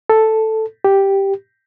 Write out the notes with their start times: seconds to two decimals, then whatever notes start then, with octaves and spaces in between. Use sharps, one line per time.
0.10 A4
0.84 G4